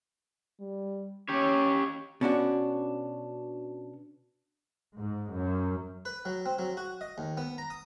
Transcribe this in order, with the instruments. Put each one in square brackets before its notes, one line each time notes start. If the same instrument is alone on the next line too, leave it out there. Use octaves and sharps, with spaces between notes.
[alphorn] G3
[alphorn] C#4 [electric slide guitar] G4 C#5
[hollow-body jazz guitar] B2 C#4 D4 F#4
[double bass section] G#2
F#2
[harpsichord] B4
F#3
C4
F#3
F#4
D#5
D#2
B3
A#5
D#6